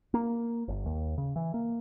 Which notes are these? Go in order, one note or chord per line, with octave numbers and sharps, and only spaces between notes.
A#3
G1
D#2
C#3
E3
A#3